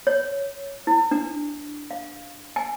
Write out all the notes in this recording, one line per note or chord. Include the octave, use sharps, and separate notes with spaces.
C#5
E4
D4
F5
G#5